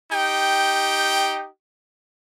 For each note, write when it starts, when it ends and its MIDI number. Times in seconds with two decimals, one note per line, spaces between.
0.12 1.48 63
0.12 1.48 67
0.12 1.48 79